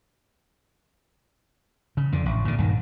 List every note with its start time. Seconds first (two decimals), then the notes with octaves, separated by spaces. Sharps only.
1.97 C#3
2.12 F2 D3
2.26 A1
2.45 A#2 D3
2.58 D#1 G2 A#2 D#3